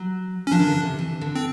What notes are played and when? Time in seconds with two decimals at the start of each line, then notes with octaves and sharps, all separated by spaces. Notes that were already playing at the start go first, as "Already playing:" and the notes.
Already playing: F#3
0.47 C#4
0.51 F3 D4
0.59 D#3
0.67 D3
0.83 C3
0.99 E3
1.21 D3
1.35 C4